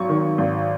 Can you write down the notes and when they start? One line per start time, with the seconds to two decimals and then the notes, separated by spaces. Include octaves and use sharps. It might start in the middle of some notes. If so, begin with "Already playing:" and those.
Already playing: G#1 F#3 C#6
0.09 D#3
0.38 G#1